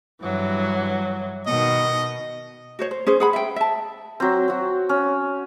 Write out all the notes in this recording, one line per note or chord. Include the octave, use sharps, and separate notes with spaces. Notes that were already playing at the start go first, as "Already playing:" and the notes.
G2 E3 F#3
B2 D#3 D#5
F#4 C5 C#5
C5
C#4 G#4 C5
G#4 F#5 B5
E5 G5
E5 A5
F#3 C4
C4 F#4
C#4